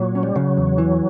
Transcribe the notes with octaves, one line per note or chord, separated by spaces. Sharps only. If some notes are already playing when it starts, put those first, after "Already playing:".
Already playing: A#2 F#3
C#4
G3
C#3 F#3
E2
E3